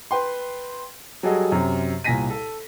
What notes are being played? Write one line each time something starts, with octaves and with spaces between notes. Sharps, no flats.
B4 G5 C6
F#3 G3 F#4 G#4 A4 D#5
F#2 C3
C2 A#2 G#5 A#6 B6 D#7
A4